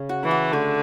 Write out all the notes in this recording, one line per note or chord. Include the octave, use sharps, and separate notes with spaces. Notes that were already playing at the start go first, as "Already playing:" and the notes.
Already playing: C#3 C#4
F#4
E3
F#4
D3 A3